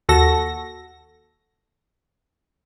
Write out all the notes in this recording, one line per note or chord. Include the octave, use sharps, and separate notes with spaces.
D#2 F#4 A4 A#6